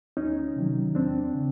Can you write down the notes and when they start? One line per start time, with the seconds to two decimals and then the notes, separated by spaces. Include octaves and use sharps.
0.17 D2 C#4 D#4
0.56 C3 D#3 F#3
0.95 E2 C4 D4
1.34 C#3